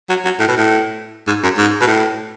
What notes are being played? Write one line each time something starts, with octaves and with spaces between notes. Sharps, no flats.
F#3
F#3
A2
B2
A2
G#2
F#2
G#2
B2
A2